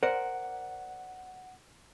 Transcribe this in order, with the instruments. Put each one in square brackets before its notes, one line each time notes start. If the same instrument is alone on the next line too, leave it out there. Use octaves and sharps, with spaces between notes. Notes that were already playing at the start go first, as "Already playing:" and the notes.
[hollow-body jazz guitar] A#4 C5 D5 [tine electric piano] F#5